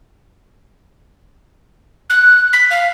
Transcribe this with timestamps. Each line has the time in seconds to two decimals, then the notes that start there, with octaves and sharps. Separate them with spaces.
2.10 F#6
2.53 B6
2.71 F5